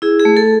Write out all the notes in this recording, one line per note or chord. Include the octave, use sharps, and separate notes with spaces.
E4 G#4
G#4
A3
A4